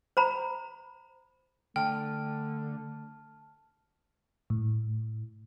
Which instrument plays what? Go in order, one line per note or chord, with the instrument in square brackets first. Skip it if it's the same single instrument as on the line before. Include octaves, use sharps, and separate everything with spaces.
[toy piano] C5 A#5 B5
[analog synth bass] D3 [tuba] A3 [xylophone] G5 [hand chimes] A5 F6
[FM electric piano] A2